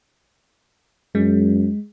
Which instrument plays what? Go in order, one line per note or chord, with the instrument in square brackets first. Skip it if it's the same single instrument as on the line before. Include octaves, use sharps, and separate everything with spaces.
[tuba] F#2 [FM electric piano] G#3